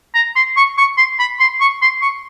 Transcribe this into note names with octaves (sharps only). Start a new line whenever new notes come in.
A#5
C6
C#6
C#6
C6
B5
C6
C#6
C6
C#6